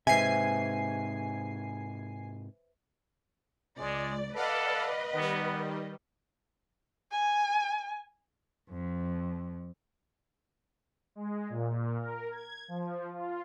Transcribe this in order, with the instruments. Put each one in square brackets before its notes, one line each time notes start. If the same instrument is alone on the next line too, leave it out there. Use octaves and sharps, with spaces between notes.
[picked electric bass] G#2 C3 [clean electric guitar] B4 C5 E5 [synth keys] G#5 C7
[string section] C#2 D5 [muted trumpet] G#3
[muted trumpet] A4 [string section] B4 D#5 [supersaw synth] D5 F5 F#5
[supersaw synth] D#3 G3 [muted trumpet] B3
[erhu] G#5
[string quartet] F2
[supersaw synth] G#3
A#2
A#4
G#6
F3
F4